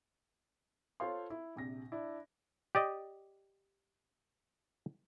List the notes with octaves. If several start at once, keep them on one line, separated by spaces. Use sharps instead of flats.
F4 A4 C5 C#5 F5 C6
E4
A#1 C3 A#6
D4 E4
G4 D5 D#5